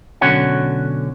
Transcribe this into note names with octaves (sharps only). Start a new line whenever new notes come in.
B1 D3 C#4 F#4 C#5 F#5